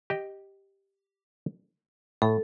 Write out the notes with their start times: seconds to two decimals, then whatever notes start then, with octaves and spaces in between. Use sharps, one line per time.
0.10 G4 D#5
2.22 A2 A4